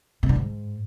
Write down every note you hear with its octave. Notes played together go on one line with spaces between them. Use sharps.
B2
D3
G#2